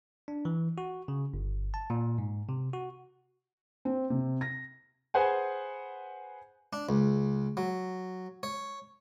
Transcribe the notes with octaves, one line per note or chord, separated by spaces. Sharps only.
D4
E3
F#4
C#3
G1
A5
A#2
G#2
C3
F#4
C4
C3
A#6
G#4 B4 C5 F#5 G#5
D4
C#2
F#3
C#5